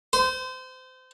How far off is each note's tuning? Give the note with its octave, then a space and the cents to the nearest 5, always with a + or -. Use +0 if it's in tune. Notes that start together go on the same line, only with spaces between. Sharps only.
C5 -30